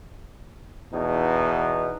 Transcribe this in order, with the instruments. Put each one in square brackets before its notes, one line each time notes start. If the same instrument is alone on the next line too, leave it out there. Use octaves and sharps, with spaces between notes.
[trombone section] E2 B2 D#4